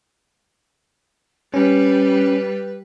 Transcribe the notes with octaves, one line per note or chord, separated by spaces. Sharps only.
G3 C#4 B4